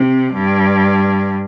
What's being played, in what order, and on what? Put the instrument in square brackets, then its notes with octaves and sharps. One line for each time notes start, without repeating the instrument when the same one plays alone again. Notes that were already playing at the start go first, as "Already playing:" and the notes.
Already playing: [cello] C3
G2